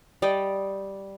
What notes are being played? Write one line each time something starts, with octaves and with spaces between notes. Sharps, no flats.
G3 D5 D#5 G5